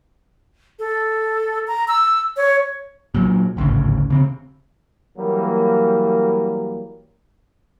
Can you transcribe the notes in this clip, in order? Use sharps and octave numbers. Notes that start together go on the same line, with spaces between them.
A4
A#5
E6
C#5
A#2 F#3
G#1 D2 A2 C#3
C#3 C4
E3 F#3 G3 A#3